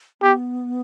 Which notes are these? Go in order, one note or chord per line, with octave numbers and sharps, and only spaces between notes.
B3 G4